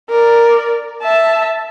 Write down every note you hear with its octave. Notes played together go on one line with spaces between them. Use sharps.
A#4 D5
E5 A5